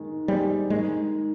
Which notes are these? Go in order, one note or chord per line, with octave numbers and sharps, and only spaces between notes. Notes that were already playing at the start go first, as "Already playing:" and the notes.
Already playing: D#3 G#3
G3 G#3 C4 G4
D#3 G#3